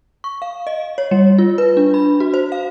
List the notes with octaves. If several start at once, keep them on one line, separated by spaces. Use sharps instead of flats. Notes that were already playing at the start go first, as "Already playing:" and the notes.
C#6
F5
D#5
C#5
G3
F4
B4
D4
B5
F#4
C5
F5